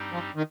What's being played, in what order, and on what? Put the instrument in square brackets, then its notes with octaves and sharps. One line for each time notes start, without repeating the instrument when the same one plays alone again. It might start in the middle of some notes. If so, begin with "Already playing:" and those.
Already playing: [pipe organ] G2 G3 C4 D#4 G4
[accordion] F3
D#3